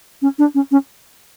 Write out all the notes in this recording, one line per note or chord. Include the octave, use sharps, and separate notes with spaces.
C#4
D4
C#4
C#4